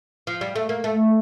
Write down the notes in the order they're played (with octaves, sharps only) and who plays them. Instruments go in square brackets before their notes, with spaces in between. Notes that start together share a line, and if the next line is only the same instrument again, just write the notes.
[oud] F3
G3
A3
A#3
A3